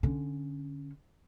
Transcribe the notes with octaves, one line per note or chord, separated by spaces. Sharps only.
D3 C#4